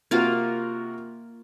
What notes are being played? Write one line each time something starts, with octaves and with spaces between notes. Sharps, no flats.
C3 A#3 F4 F#4 A#4